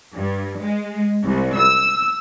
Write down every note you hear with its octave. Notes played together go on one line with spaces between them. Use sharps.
G2
G#3
C2
E6